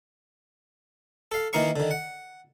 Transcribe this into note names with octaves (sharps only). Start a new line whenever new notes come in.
A4 F5
D#3 E3 A#3 D#4 F5 C#6
D3 D#3
F#5